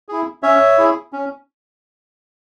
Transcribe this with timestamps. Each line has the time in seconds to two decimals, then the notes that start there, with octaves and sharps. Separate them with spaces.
0.09 E4 G#4
0.43 C#4 C#5 E5
0.78 E4 G#4
1.13 C#4